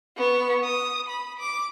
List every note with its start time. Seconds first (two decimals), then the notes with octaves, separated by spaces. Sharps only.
0.17 B3 C#6
0.63 D#6
1.08 B5
1.39 D6